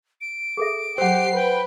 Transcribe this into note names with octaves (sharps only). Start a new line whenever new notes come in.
D7
G#4 A4 E5
F#3 G4 C5 F#5 E6 C7
B4 G5